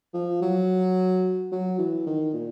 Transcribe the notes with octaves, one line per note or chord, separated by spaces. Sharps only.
F3
F#3
F#3
E3
D#3
A#2